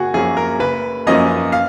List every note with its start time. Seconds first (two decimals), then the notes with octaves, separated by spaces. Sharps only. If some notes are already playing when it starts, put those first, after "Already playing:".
Already playing: F#1 F#4 G#4
0.14 F#2 F3 A#3 C#4 G#4
0.37 A#4
0.59 F#1 B4
1.07 F#2 F3 A#3 C#4 D#5
1.52 F5